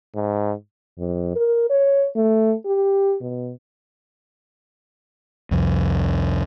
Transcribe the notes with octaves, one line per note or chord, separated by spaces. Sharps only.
G#2
F2
A#4
C#5
A3
G4
B2
C2 F2